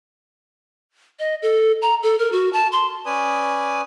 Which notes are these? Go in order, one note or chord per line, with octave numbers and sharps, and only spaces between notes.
D#5
A4
A#5
A4
A#4
F#4
A5
C6
C#4 B4 D5 G#5 D#6